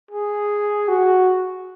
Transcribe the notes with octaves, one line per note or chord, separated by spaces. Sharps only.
G#4
F#4